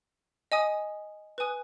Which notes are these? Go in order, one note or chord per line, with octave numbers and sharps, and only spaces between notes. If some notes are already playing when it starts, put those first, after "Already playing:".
D#5 G#5 D#6
B4 G#5 D#6 F#6